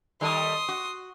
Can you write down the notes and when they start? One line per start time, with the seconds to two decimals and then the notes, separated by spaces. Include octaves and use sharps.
0.21 D#3 G3 A4 C6 D#6
0.68 F#4